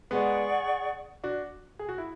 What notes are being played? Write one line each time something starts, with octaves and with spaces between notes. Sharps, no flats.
G#3 B3 G#4 D5 F#5 C#6
D4 F#4
G#4
F#4
E4